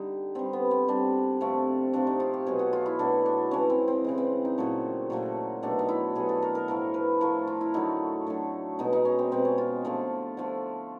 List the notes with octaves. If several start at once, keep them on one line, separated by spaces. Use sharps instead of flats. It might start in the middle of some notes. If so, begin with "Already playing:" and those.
Already playing: D3 G3 D#4
D3 G3 C4
B3
C4
D3 G3 D4
C3 F3 A3
C3 F3 A3 D4
D#4
F4
G4
B2 F#3 A3 G#4
F#4
F4
E4
B2 F#3 A3 D4
D4
C#3 E3 G#3 C#4
C4
C4
C#3 E3 G#3
C4
D#4
A#2 F#3 A3
A#2 F#3 A3
B2 F#3 A3 D4
D#4
E4
B2 F#3 A3 G#4
A4
A#4
A#4
A2 F3 A3 A#4
B4
A2 F3 A3 A#4
F4
E4
D3 F#3 A3 D#4
D3 F#3 A3
B2 G#3 D#4
D#4
C#4
C4
B2 G#3 C4
C#4
F4
D3 F3 A3 F4
D3 F3 A3